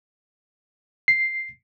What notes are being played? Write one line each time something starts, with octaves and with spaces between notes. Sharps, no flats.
C7